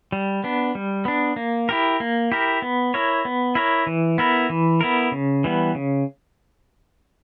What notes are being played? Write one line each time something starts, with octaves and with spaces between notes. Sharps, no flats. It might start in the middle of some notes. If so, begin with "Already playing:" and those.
G3
B3 D4
G3
B3 D4
A#3
E4 G4 A#4
A#3
E4 G4 A#4
B3
E4 A#4 C#5
B3
E4 A#4 C#5
E3
B3 E4 A#4
E3
B3 E4 A#4
C#3
E3 G3 B3
C#3